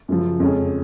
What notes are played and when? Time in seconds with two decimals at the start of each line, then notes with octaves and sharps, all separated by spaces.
0.08 F#2 C#3 F3
0.40 F2 C#3 G#3 C#4